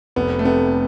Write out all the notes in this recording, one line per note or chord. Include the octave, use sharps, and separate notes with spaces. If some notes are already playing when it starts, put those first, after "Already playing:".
F1 B3
A3
C3 B3